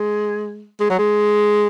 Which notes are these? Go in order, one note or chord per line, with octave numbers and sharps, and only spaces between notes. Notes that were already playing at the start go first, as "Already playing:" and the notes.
Already playing: G#3
G#3
F#3
G#3